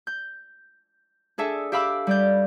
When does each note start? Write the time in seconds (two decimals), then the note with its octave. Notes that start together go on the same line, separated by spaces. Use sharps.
0.07 G6
1.38 D4 G#4 A4 E5
1.72 G4 E5 F5 B5 D6 E6
2.07 G3 D5 G6